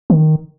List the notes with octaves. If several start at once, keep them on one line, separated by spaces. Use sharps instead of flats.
D#3